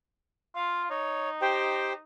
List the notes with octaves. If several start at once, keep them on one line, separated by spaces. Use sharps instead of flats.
F4 F5
D#4 C#5
G4 C5 G5